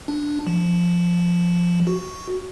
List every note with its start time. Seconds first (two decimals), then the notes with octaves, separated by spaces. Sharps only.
0.08 D4
0.47 F3
1.87 F#4